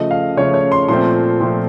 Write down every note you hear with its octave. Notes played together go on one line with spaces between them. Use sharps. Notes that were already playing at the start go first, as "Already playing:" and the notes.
Already playing: C#3 F3 A3 D#5
F5
C#3 F3 A3 C#5
C#5
C6
A#2 F3 A3 C4 C6
A#2 F3 A3 C4